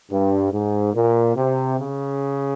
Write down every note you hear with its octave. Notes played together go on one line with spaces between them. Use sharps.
G2
G#2
A#2
C3
C#3